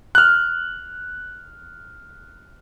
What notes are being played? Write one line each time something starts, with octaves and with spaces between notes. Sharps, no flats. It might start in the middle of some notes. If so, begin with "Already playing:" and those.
F6 F#6